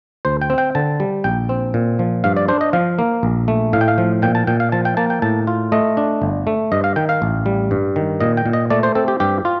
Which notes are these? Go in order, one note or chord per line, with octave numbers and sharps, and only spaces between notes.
D2 C5
G5
C4
G5
D3 A5
G3
A#1 G5
C4
A#2
F3
G2 F5
D5
D4 C5
D#5
F3 F5
A#3
A#1
A3
A2 F5
G5
F5
F3
A#2 G5
A5
A#2 G5
F5
F3 A5
G5
A#3 A5
G5
A2 A5
F4
A3 D#5
D4
G1
A3
G2 D#5
F5
D#3 G5
F5
A1
G3
G2
D#3
A#2 D#5
G5
A#2
D#5
A3 D5
C5
C4 A4
G4
G2 G4
F4